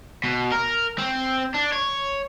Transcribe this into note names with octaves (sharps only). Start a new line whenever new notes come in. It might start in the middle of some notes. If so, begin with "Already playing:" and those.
B2
A#4
C4
D4
C#5